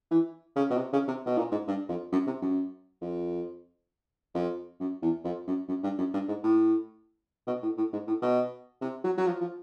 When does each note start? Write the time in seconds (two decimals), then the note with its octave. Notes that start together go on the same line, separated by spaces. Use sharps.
0.11 E3
0.56 C#3
0.70 B2
0.77 C3
0.93 C#3
1.08 C3
1.26 B2
1.37 A#2
1.52 G#2
1.67 G2
1.89 F2
2.12 F#2
2.26 C3
2.42 F#2
3.01 F2
4.34 F2
4.80 F#2
5.02 E2
5.24 F2
5.47 F#2
5.68 F#2
5.83 G2
5.98 F#2
6.13 G2
6.28 G#2
6.43 A2
7.47 B2
7.63 A2
7.77 A2
7.93 G#2
8.07 A2
8.22 B2
8.81 C3
9.04 F#3
9.18 F#3
9.26 F3
9.41 F3